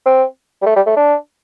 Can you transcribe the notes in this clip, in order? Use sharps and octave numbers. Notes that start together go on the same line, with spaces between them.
C4
G3
A3
G3
A3
D4